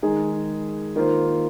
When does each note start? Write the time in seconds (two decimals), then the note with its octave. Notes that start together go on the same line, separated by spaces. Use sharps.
0.02 D#3 G#3 D#4 G#4
0.96 D#3 A#3 F4 C5